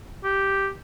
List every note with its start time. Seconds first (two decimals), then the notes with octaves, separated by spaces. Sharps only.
0.24 G4